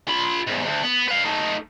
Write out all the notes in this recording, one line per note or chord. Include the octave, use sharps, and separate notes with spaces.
F4 B5
E2 G#2
D2
B3
B4 F5
A3 D#4